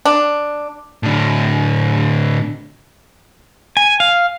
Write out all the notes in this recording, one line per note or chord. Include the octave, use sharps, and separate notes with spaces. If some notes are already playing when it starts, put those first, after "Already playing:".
D4
A2 D3
G#5
F5